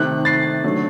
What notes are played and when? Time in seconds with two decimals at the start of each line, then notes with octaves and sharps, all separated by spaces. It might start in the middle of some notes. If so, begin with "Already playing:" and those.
Already playing: C3 D#3 A3 F#6
0.25 A6 C7
0.64 D3 F#3 A3